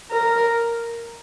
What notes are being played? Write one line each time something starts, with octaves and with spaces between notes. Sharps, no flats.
A#4